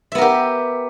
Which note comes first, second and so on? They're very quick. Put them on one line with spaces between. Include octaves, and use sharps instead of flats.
E5 B3 A#4 G4